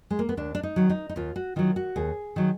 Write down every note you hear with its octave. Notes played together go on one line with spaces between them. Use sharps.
G#3
A#3
B3
D#2 D4
D4
D#4
D#3 F#3
D#4
D#4
D#2 F4
F#4
D#3 F#3 F4
F#4
D#2 G#4
D#3 F#3